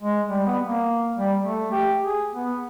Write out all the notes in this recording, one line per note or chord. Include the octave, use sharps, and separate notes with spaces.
G#3
G3
B3
A#3
G3
A3
G4
G#4
B3